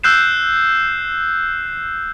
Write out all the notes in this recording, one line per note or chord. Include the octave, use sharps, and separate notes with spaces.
E6 F#6 G6 C7 E7